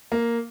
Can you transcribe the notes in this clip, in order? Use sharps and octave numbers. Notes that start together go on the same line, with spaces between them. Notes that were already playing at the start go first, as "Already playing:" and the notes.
A#3